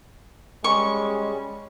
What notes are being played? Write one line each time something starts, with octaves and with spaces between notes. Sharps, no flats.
G3 G#3 C#4 C#6